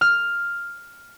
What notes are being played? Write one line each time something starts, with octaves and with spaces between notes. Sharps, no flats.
F6